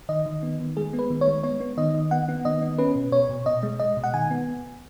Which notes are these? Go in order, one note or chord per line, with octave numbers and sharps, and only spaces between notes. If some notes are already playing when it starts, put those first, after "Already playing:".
D#3 D#5
D#3
B3
D#3
G#3 G#4
B3
B4
D#3
C#5
G#3
B3 C#5
B3
D#3 D#5
D#3
B3 F#5
B3
D#3 D#5
B3
C#4 B4
B2
B2 C#5
B2
B2 D#5
G#3
G#3 D#5
B2
F#5
D#3 G#5
B3